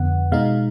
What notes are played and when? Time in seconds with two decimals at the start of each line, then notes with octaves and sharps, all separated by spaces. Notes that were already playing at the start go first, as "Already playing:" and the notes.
Already playing: F2 D3 B3 F#5
0.32 B2 G#3 D#4 F5